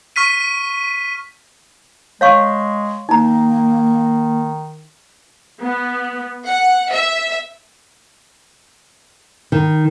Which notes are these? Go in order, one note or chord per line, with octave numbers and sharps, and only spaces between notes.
C#6 F6 B6 D#7
G#3 C#5 F5 C#6
D#3 A#3 D#4 A#5
B3
F#5
E5
D#3